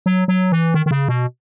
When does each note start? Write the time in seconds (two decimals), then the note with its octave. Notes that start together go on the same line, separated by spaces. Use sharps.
0.06 F#3
0.28 F#3
0.52 E3
0.74 D#3
0.86 D#3
0.91 C#3
1.08 B2